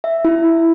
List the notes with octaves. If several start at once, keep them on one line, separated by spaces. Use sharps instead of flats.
E5
E4